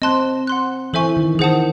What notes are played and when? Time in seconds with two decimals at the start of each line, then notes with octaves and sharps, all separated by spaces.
0.02 C4 D#5 A5 C6 F#6
0.47 F#5 C6 F#6
0.93 E3 A4 C5 E5 G#5 C#6
1.17 D#3
1.35 E3
1.39 D#3 G#4 C5 F#5 A5 D#6